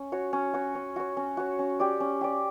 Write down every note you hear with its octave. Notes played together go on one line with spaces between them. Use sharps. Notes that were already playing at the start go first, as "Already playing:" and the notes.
Already playing: C#4
F#4 C#5
C#4
F#4 C#5
C#4
F#4 C#5
C#4
F#4 C#5
C#4
G4 D5
C#4
G4 D5